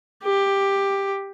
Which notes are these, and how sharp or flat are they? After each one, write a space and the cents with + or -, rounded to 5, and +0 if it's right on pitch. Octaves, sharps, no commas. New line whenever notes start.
G4 +10